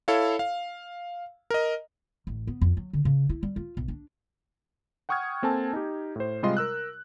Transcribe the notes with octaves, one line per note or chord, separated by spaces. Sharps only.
E4 A4 C#5 F5
F5
A#4 D#5
A1
B3
F2
F#3
D3
C#3
E4
G3
F4
B1
D4
F#5 G5 C#6 D#6 F6 G#6
A#3 C4 A4 G#5 A5
D#4 G4
A2 C5
C3 G3 G#3 F4 D#5 C6
A#4 E6 F#6